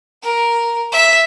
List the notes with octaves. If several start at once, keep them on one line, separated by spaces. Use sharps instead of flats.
A#4
E5